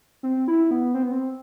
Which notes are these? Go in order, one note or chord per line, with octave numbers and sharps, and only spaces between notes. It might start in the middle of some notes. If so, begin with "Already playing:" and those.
C4
E4
B3
C4
B3
C4